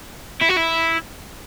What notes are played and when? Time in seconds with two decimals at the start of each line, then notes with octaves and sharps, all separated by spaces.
0.42 E4
0.50 F#4
0.57 E4